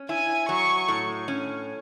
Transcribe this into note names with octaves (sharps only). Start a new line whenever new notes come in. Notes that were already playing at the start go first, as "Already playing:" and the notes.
Already playing: C#4
E4 G#5
F#3 C#6
A2
C#4